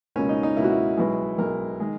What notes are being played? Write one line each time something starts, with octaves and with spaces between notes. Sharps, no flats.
C#2 B2 A#3 C#4
D#4
D#4
C#2 B2 A#3 E4
F#4
E4
B1 B2 G#3 B3
B1 B2 G#3 B3 A#4
D#3 G#3